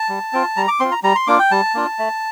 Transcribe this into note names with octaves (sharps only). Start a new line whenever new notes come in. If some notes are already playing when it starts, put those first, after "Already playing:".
Already playing: A5
G3
C4 F4
G3 A#5
D6
C4 F4 C6
A#5
G3 A#5
C6
A#3 D4 F4 D6
G5
G3 A5
A#3 D4 F4
A3